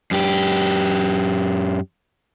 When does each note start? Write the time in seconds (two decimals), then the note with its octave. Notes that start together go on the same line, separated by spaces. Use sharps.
0.11 F#2 G4